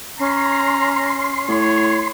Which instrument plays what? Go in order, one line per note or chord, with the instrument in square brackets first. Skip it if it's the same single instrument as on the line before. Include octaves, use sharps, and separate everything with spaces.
[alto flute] C#4 [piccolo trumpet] A#5 [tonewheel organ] C6
[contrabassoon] A2 [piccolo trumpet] C#5